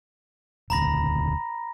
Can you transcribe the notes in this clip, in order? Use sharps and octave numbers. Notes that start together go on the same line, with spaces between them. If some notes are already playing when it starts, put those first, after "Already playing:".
E1 D2 A#5 B5 A#6